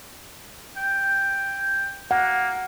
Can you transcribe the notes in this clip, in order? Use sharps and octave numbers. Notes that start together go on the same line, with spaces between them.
G5
A#3 F#5